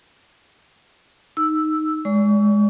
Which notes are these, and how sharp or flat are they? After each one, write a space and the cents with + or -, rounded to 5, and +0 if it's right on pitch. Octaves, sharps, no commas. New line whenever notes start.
D#4 +0 E6 +0
G#3 +0 D5 -40 C#6 +35